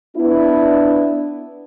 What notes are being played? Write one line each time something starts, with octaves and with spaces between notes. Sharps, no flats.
B3 D4 E4